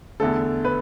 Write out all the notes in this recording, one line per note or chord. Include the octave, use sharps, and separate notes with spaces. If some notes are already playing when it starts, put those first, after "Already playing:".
E2 D3 A3 A4
B4